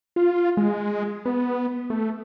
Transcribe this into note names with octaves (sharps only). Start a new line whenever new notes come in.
F4
G#3
B3
A3